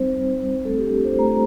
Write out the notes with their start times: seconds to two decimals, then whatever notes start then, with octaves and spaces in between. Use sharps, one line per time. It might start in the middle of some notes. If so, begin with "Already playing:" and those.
Already playing: G3 C4 D#4 C5
0.11 G3
0.29 G3
0.48 C4
0.65 A3 A4
0.78 G4
0.83 D4
1.01 F4 C5
1.18 A3 A#5